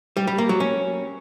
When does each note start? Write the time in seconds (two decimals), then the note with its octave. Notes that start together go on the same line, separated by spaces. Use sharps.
0.17 G3
0.27 G3
0.38 A#3
0.49 F#3
0.60 C#4